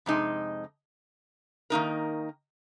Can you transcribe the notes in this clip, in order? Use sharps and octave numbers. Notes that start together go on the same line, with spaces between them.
F2 C3 G#3 D#4
D#3 A#3 D#4 A#4